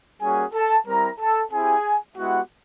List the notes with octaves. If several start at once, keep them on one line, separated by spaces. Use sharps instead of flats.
G3 A#3 C#4 F#4 G#4 G#5
A4 A5
G3 C4 E4 A#4 A#5
A4 A5
C4 E4 G4 G#4 G#5
G#3 B3 E4 F#4 G4 F#5